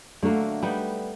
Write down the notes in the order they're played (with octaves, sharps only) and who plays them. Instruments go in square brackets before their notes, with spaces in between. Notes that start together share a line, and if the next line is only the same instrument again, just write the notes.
[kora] D3 F#3 A#3 [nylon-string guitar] A3
[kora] G3 B3 D#4